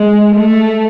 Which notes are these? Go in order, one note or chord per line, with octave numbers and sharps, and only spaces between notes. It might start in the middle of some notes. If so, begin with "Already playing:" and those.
Already playing: G#3
A3